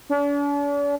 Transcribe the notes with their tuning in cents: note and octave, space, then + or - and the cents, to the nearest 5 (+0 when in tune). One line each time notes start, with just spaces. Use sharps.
D4 -45